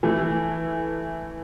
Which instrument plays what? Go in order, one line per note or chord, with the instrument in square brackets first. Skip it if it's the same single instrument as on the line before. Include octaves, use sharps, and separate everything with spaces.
[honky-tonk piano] E3 A3